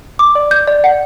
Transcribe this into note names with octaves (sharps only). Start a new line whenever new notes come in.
D6
D5
G6
D5
F#5